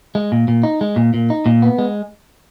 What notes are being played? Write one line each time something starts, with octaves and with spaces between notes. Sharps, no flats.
G#3
A#2
A#2
D#4
G#3
A#2
A#2
D#4
A#2
B3
G#3